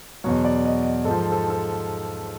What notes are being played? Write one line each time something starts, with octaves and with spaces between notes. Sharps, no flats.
E2 B2 F#3 C#5
D5
D#5
G#2 F3 A4
A4
A4